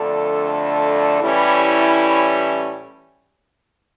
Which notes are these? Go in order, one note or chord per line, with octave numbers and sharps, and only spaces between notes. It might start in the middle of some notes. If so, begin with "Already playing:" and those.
Already playing: F2 D3 A3 D4 A4
A2 E3 G3 C#4 E4